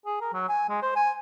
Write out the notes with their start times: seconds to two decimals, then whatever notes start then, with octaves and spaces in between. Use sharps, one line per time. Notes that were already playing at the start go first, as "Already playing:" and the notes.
0.06 G#4
0.21 A#4
0.33 F#3
0.49 G#5
0.69 G#3
0.82 C5
0.96 G#5